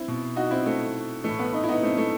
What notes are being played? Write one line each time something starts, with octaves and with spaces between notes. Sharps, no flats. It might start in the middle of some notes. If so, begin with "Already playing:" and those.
Already playing: C4 E4
B2
D#4 F#4
C4 E4
A3 C4
A2 E3 A3
B3
B3 D#4
E4
B3 D#4
A3 C4
A3